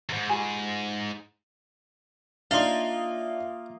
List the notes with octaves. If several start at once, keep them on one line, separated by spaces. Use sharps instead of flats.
E2 G#2
F4 G4 G#5
A#3 D4 D#4 F4 D5 E5 F5 D#6